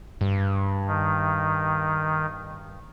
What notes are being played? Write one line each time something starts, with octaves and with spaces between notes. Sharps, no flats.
G2
D#3